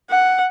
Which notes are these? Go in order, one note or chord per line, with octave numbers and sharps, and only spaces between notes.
F#5